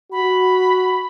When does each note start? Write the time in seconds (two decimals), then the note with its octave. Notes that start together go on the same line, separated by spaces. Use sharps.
0.12 F#4 B5